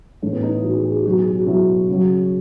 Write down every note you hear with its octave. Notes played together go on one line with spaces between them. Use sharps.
A2 E3 A3
B3
D#4
E4
A2 E3 F#4
G#4
G#4
F#4
B2 F#3 F#4
G#4
F#4
B2 F#3 E4
C#3 F#3